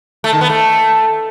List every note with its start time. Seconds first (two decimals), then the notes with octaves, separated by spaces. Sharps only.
0.24 A3
0.33 D#3
0.41 B3
0.50 A3